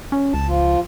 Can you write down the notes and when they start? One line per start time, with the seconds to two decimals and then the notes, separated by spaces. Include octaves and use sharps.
0.12 C#4
0.34 C#2 A5
0.48 F3 F4